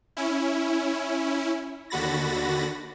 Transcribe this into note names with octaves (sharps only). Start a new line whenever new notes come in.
C#4 E4
D#2 D3 F#4 B5 A6 A#6